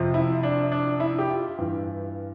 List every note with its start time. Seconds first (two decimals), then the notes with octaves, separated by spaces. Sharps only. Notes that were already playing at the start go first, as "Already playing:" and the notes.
Already playing: F2 C3 F3
0.14 E4
0.43 D4
0.72 D4
1.00 E4
1.19 G4
1.30 F4
1.58 G2 E3